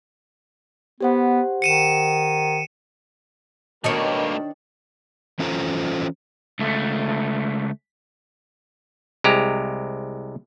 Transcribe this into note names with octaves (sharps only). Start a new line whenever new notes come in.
B3 G4 C5 F#5
D#3 C#7 D#7 E7
B2 D#3 G3 A3 A#3 D4 A#4 C#5
E3 C#4 F4 A4 C5 A#5
C#2 A3
C2 G#3 G4 A#5